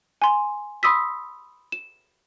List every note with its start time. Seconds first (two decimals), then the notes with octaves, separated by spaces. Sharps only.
0.22 G#5 C6
0.83 B5 C6 D#6 E6 B6
1.72 E7